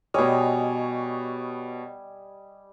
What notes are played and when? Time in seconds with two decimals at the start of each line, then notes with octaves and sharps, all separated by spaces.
0.14 B2 G3 C#5 D#5 G#5